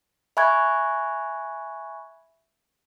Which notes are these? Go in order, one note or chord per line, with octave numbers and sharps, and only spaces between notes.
E5 G#5 B5 C#6 F#6 G#6